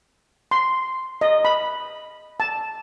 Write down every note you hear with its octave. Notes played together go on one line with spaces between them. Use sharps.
C6
D#5
B5
A5